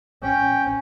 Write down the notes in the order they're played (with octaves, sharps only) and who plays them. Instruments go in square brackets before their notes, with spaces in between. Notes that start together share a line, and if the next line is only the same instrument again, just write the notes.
[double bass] C#4 [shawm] G5